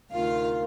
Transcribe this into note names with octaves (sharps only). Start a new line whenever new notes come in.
D2 C3 D#3 F4 F5